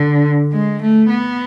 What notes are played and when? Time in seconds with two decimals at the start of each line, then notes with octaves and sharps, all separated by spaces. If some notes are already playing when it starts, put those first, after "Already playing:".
Already playing: D3
0.53 G#3
0.82 A3
1.09 B3